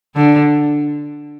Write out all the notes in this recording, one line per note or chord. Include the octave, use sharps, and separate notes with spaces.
D3